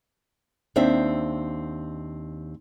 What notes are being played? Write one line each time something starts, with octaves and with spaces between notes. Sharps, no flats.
D#2 C4 D4 E5